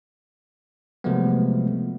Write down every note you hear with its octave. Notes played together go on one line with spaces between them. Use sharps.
C3 F3 F#3 G#3 A3 B3